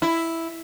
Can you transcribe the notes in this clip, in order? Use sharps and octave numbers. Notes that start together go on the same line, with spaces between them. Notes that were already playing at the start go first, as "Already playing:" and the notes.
E4